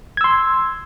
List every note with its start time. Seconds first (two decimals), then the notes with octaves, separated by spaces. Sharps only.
0.17 G#6
0.21 E6
0.24 C6